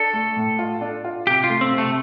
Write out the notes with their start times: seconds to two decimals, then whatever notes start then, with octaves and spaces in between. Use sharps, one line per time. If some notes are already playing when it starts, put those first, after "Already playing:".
Already playing: D4 A4
0.13 A3
0.36 A2
0.59 F4
0.81 D4
1.04 F4
1.27 C3 G4
1.44 F4
1.49 A3
1.61 C4
1.72 C3
1.78 A3